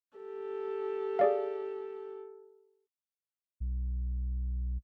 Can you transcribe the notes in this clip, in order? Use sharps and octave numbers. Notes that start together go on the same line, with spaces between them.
G4 A4
G#4 D5 F5
B1